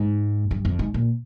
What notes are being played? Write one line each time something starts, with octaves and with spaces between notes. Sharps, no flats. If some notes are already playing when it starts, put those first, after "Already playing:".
Already playing: G#2
G2
F2
G#2
A#2